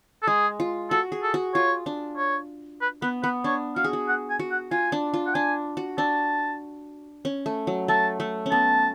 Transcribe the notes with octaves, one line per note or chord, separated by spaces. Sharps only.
A4
G#3 G#4
F4
F#4 A4
G#4
A4
F#4
F4 C#5
D4
C#5
B4
B3 B4
B3 B4
D4 C#5
F#4 F5
G#4
F#4
F#5
G#5
F#4
F#5
F4 G#5
D4
F4
F#5
D4 G#5
F#4
D4 A5
C#4
A3
F#3
A3 A5
A3
C#4
B3 A5